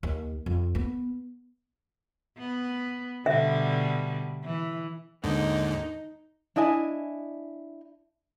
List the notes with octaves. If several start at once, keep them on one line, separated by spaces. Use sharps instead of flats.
D#2
F2
B3
B3
B2 D3 G3 E5
E3
D#2 G#2 D3 D#4
D4 E4 D#5 G#5